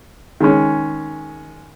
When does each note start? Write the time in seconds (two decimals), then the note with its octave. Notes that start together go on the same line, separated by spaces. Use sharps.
0.40 D#3 G#3 C#4